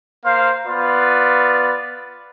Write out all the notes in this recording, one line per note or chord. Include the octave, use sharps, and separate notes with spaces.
A#3 C5 F5
B3 F4 B4 D5